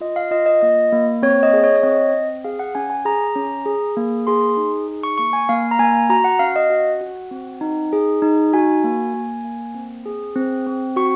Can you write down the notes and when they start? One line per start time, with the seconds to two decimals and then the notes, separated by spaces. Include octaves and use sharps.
0.01 F4 D#5
0.16 F5
0.31 F4 D#5
0.46 D#5
0.62 A#3 D#5
0.92 A#3
1.23 C4 C#5
1.43 D#5
1.53 G#4
1.64 C#5
1.76 C#5
1.83 C4 D#5
2.14 C4
2.45 G#4 F5
2.59 F#5
2.75 C#4 G#5
2.90 G#5
3.05 G#4 A#5
3.36 C#4
3.66 G#4
3.97 A#3
4.27 G#4 C6
4.57 D#4
4.88 G#4
5.03 C#6
5.18 A#3 C#6
5.33 G#5
5.49 A#3 F5
5.71 A#5
5.79 A#3 G#5
6.10 F#4 A#5
6.24 F#5
6.39 C#4 F5
6.56 D#5
6.70 F#4 F#5
7.01 F#4
7.31 C4
7.61 D#4
7.93 G#4
8.22 D#4
8.53 F#4 G#5
8.84 A#3
9.14 A#3
9.44 A#3
9.74 C4
10.05 G#4
10.36 C4
10.67 C4
10.96 F#4 C#6